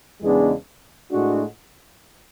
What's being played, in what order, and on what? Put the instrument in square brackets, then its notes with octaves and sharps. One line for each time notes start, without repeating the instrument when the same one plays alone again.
[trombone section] E2 C#3 G#3 B3 D4
A2 G#3 D4 F#4